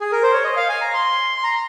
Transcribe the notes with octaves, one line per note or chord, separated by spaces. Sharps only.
G#4
A#4
C5
C#5
D#5
F5
G#5
A#5
C6
C6
A#5